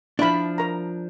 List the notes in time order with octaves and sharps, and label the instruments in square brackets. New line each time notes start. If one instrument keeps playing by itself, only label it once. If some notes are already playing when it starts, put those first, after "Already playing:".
[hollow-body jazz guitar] F3 D4 [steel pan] E4 B5
[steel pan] A#4 A#5